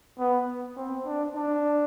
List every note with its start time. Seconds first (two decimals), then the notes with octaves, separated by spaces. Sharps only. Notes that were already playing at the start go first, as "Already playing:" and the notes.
0.19 B3
0.77 C4
1.06 D4
1.35 D4